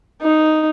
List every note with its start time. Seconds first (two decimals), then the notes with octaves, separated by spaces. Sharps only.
0.21 D#4